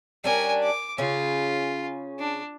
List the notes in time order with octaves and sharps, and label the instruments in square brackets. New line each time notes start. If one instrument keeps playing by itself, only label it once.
[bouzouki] G3 C#4 D4 [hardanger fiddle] A#4 G#5
[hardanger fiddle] D6
[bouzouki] C#3 C#4 [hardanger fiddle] F4
[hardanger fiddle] D4